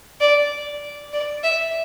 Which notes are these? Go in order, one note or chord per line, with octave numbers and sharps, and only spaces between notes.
D5
D5
E5